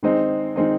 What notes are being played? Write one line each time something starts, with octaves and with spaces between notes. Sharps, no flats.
D#3 G#3 C4 D#4
D#3 G#3 C4 D#4